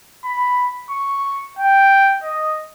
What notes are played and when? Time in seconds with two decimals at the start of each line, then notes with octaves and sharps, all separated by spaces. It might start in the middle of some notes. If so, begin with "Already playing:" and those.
0.25 B5
0.91 C#6
1.59 G5
2.24 D#5